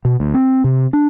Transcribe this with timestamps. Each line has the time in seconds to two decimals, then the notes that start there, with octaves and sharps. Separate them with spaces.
0.05 B2
0.20 D2
0.34 C4
0.64 C3
0.93 D4